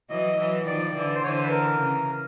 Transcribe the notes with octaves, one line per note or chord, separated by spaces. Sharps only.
E3 F#3 D#5
E3 F#3
D#3 F3 D5
D3 E3
C5
D3 E3 C#5
C5
B4
A#4
C#3